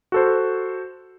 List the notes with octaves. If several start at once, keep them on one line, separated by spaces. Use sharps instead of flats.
F#4 A4 C5